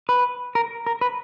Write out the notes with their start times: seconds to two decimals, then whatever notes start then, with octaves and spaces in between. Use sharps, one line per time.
0.09 B4
0.55 A#4
0.86 A#4
1.01 B4